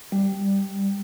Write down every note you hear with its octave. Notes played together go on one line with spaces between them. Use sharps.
G3